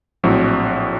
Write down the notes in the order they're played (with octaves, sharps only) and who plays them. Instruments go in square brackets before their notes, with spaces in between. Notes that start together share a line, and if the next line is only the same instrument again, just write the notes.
[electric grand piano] A#1 A2 F#3 C4